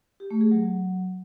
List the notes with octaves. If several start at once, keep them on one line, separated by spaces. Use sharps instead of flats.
G4
A3
G#4
F#3